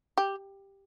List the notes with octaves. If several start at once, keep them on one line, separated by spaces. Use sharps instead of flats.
G4